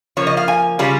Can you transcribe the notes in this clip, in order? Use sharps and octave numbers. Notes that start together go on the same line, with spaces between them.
C#3 F3 A#3 C#5
D#5
F5
G#5
C#3 G3 C#4 F4